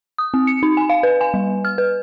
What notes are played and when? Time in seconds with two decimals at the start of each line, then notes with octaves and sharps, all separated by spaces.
0.18 D#6
0.34 C4
0.47 C#7
0.63 D#4
0.77 G#5
0.90 F5
1.03 B4
1.21 G#5
1.34 G3
1.65 F6
1.78 B4